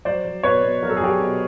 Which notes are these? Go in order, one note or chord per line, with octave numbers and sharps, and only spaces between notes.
F#3 C5 D5
F#3
B2 B4 C#5
B2
F#3 A#4
A4
G#4
F#3 G4 A4
B2